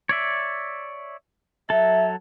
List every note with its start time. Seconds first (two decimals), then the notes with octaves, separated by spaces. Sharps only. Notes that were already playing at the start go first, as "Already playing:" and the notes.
0.09 C#5 D5 E5
1.70 F#3 A4 E5